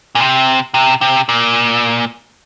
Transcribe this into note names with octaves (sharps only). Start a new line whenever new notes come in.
A#2
C3
C3
C3
A#2